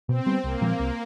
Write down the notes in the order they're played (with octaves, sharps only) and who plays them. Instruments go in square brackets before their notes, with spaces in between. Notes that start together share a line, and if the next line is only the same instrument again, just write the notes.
[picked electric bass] B2 [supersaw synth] C4
[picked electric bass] G3 B3
[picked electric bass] C2 [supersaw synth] A#3
[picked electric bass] A#2 F3 G#3
C2